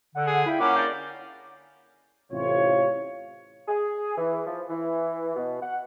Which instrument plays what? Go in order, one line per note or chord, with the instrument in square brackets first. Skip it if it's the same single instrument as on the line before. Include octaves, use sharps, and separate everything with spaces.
[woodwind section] D3 [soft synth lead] F#5
[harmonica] G#4
[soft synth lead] E4 [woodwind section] F4 G5 B5
[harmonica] A#3 C#4 D6 [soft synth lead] F#5
[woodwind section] D4 A#4 D5 [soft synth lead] G6
[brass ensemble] A1 C3 F4 C#5
[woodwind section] G#4
E3
F3
E3
B2
F#5